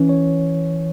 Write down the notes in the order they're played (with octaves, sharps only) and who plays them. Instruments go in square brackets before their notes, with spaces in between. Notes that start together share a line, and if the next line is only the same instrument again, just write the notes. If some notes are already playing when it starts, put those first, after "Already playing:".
Already playing: [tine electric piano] E3 [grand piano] C#4
[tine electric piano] C#5